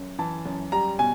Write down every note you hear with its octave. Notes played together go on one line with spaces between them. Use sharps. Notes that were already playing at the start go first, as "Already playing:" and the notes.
Already playing: F#2
E3 A5
F#2
G3 A#5
B2 G#5